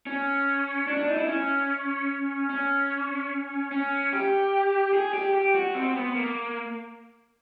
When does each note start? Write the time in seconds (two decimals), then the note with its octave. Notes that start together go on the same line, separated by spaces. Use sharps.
0.07 C#4
0.87 D4
0.97 D4
1.08 D#4
1.17 E4
1.28 C#4
2.50 C#4
3.72 C#4
4.13 G4
4.93 G#4
5.14 G4
5.34 G4
5.55 F#4
5.75 C4
5.95 B3
6.15 A#3